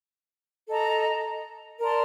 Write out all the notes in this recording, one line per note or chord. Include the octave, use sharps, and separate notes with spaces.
A4 D#5 A#5
A#4 D5 A5 C6